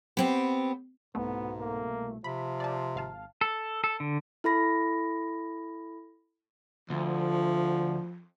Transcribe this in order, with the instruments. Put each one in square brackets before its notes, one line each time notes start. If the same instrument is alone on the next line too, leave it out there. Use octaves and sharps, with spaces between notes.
[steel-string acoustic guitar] B3 C4 G4
[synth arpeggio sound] C2 B2 A3 [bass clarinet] G#2 [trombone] B3
[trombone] A#3
[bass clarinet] C3 [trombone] F3 [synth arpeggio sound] B5
[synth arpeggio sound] D5 A5
G#1 F5 A5
[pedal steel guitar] A4
A4
D3
[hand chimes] E4 A4 B5 A#6
[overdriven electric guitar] D2 [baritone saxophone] F3